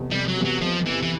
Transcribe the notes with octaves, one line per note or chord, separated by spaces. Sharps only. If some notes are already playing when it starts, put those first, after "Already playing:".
Already playing: F1 E2 C3
F1 G3
F#3
E2 C3
F#3
F1 F3
E2 C3 E3
E3